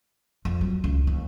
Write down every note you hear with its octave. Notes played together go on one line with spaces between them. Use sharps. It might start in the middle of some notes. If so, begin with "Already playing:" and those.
F2
F#3
C#2
D#2